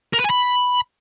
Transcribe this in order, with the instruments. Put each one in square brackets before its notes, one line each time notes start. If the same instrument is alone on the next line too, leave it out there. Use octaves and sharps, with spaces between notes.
[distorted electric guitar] A#4
B4
G#5
B5